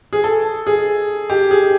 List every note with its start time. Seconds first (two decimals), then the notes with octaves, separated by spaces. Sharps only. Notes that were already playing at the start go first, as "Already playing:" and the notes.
0.13 G#4
0.24 A4
0.67 G#4
1.30 G4
1.51 G#4